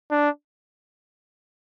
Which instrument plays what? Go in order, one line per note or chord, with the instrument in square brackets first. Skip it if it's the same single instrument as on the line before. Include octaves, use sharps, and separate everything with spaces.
[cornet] D4